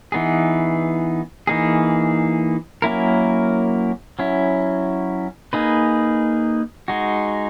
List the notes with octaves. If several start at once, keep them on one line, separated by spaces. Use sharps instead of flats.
E3 B3 D#4 G#4
E3 A#3 D#4 G#4
F#3 A#3 C#4 E4 A#4
F#3 C#4 E4
A#3 D#4 G#4 B4
G#3 D#4 F#4